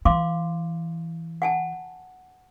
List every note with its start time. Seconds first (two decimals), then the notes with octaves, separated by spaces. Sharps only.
0.05 E3 F5 C6 D6
1.42 F#5 G#5 A5